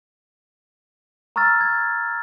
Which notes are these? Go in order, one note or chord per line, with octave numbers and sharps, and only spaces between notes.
A#5 C#6 E6 F6 A6
G#6